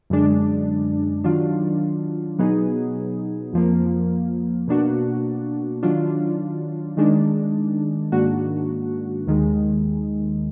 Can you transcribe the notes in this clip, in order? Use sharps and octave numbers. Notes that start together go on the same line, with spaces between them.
F#2 D3 G#3 D4
D#3 F#3 D4 F4
B2 F#3 B3 D#4 G#4
F2 F3 A#3
B2 A#3 D4 F#4
D#3 F#3 D4 F4
D#3 G#3 D4
G#2 D#3 A#3 D4 F#4
D#2 D#3 G#3